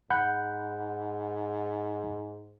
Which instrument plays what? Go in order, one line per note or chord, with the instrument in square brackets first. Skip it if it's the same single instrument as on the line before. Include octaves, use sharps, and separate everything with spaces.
[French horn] G#2 [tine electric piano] F#5 B5 G6